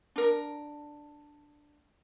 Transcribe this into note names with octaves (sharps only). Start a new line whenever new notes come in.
D4 A#4